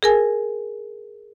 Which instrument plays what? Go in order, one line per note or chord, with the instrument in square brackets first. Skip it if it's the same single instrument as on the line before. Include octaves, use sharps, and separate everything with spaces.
[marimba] G#4 A#4 G#5